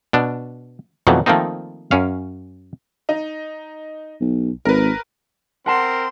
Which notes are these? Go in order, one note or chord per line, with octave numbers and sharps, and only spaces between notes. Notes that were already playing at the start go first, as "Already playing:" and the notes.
B2 D4
F2 B2 D#3 E3 F#3 A3
D#3 F3 A3 A#3 C4 D#4
F#2 C#4 F5
D#4
B1
G#1 A#4 B4
C4 A#4 F#5 A5 C6 E7